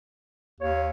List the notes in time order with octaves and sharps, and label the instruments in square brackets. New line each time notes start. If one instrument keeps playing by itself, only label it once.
[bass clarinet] D#2 [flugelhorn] C#5